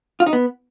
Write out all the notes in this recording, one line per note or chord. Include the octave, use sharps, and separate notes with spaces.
F4
D#4
B3